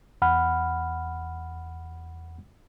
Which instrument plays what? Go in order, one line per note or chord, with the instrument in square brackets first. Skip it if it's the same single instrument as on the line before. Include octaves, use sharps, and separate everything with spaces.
[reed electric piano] E2 F#5 B5 F6